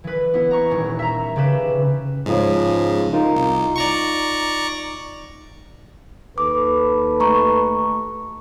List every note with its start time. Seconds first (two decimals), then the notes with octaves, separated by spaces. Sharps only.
0.04 E3 B4
0.34 B3 E4
0.51 A#5 C#6
0.70 D#1 C#4
0.99 E5 A#5
1.36 C#3 G4 B4 E7
2.26 G#2 C#3 F3 G#3
3.13 D#4 F4 A#4
3.35 C2
3.76 D5 A#5 C#6
6.38 D#2 A4 B4 D6
7.20 A3 A#5 C#6